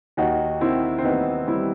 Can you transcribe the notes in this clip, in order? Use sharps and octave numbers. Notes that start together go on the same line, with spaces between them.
D#2 D#4 F#4
D#3 C4 E4
C4
D#2 B3 D#4
G3 C4 E4